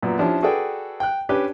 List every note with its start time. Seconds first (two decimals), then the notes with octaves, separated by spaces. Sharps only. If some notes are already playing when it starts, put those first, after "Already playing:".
0.03 F#2 A#2 B3
0.19 F3 C#4 D4 E4 G4
0.42 F#4 G#4 A4 B4 D5 G5
1.00 G5 F#6
1.29 C#4 D4 G4 B4